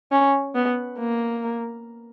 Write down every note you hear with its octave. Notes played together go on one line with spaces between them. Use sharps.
C#4
B3
A#3